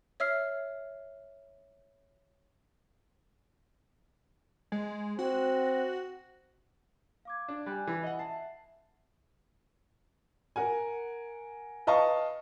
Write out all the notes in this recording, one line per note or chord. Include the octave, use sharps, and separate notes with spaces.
C#5 E5 E6 F6 C7
G#3
C4 F#4
F5 D6 G#6
D4
G3 G#5 F#6
E3
D#5 F#5
E5 A5 C7
A#4 F#5 G#5
B4 D#5 F5 A5 C#6